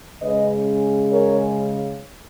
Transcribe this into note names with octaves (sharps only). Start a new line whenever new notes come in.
C#3 G#3 C#4 B4 D#5
A#4 C#5